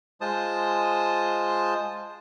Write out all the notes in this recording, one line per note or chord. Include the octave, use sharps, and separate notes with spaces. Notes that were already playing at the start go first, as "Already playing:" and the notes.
G#3 F4 C5 A5 D#6